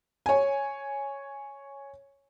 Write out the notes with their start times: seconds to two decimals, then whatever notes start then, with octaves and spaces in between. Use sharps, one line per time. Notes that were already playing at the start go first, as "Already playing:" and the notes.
0.26 C#5 G#5